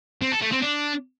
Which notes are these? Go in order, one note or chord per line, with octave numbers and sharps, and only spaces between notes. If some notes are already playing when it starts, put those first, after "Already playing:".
C4
A4
A3
C4
D4